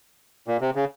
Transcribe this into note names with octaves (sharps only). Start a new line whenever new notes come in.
A#2
C3
C#3